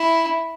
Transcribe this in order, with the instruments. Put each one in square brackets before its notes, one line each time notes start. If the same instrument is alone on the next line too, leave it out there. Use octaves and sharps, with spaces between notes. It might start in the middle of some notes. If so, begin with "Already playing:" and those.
Already playing: [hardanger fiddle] E4